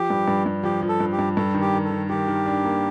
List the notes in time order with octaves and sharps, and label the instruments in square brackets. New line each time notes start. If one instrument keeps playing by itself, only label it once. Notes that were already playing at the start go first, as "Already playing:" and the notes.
Already playing: [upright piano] F3 [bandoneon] G4
[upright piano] G2
G2
G2
[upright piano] F3 [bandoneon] G4
[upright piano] F3
[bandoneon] A4
[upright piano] G2
[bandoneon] G4
[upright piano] G2
[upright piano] G2 [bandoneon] A4
[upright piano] D#3
[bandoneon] G4
[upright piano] D#3
[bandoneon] A4
[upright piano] D#3
[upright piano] D#3 [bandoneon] G4
[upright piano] D#3
D4
A#3